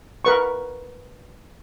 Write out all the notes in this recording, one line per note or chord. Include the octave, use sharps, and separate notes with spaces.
A#4 B4 C#6